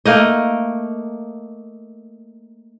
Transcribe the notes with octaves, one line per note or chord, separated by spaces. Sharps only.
A3 A#3 D#4 D#5